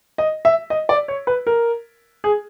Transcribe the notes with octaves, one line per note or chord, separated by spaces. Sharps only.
D#5
E5
D#5
D5
C#5
B4
A#4
G#4